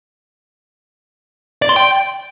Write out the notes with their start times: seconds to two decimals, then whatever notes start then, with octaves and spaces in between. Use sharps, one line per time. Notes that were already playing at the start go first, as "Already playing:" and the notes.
1.62 D5
1.69 C6
1.76 G5